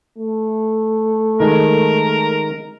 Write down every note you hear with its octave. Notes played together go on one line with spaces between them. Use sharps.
A3
D#3 G#3 A#4